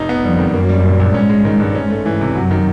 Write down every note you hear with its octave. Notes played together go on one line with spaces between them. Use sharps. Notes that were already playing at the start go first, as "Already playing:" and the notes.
Already playing: F1 D#4
B3
F2 G3
D#3
F#2 A#3
G3
A#2
A#1
G#2 C#4
G#3
D#3
G2
C#4
A3
E3
C3
F#2 F#3
D#3